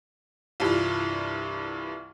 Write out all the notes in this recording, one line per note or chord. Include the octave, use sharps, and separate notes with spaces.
C2 G2 E3 F4